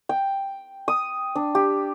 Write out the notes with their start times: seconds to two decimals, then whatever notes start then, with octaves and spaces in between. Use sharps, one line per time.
0.09 G5
0.88 D#6
1.35 D4
1.55 G4